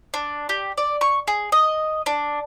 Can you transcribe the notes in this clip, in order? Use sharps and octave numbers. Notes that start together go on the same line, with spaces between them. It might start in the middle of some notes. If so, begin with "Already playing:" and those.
D4
G4
D5
C#6
G#4
D#5
D4